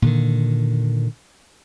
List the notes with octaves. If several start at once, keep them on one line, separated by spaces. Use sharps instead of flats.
A#2 D3 D#3